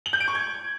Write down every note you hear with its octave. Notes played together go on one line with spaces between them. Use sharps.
F#7
G6
D7
C#6
G#6